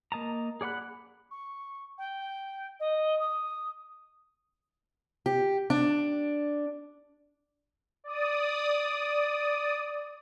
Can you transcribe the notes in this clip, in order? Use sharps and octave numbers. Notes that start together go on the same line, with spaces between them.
A#3 D#5 A5 A#5
G#4 D5 F#5 B5 F#6
C#6
G5
D#5
D#6
G4
D4
D5 D#6